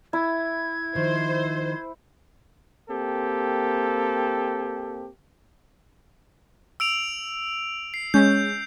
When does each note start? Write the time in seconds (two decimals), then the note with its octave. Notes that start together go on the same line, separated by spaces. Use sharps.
0.13 E4 G#6
0.95 D#3 F3 C5
2.89 A#3 C4 G4 A4
6.80 E6 D7 F7
7.94 C7
8.14 G#3 C#4 G6